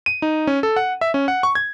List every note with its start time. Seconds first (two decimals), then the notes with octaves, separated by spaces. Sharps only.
0.06 D#7
0.22 D#4
0.47 C#4
0.63 A4
0.76 F#5
1.01 E5
1.14 C#4
1.28 F#5
1.43 C#6
1.55 G#6